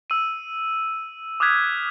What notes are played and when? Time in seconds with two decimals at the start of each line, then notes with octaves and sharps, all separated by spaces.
0.10 E6 D#7
1.40 D6 D#6 F6 F#6 G#6 B6